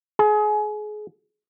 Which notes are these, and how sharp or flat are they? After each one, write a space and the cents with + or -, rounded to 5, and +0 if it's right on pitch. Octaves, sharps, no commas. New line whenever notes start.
G#4 +30